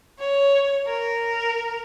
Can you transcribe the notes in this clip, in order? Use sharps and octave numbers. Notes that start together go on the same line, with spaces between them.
C#5
A#4